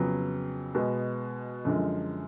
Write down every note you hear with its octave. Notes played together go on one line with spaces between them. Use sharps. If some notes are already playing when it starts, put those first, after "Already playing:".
Already playing: F2 C#3 F#3 B3
B2 G#3 B3
F#2 D3 F3 G#3